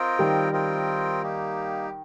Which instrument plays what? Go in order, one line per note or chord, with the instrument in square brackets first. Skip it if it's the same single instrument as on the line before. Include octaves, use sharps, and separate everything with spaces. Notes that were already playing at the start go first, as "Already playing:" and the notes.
Already playing: [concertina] C4 F4 A#4 D#5 G5
[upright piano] D#3 G3
[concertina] C4 F4 A#4 D#5 G5
A#3 D#4 G4